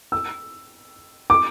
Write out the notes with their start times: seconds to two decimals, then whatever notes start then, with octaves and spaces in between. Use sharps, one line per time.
0.12 E6
1.30 D6